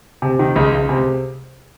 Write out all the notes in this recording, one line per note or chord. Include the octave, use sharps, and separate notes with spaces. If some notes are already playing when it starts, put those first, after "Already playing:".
C3
D#3
C#2
C#2
C3